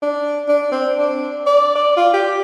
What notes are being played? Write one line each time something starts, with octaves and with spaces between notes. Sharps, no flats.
D4
D4
C4
D4
D5
D5
F4
G4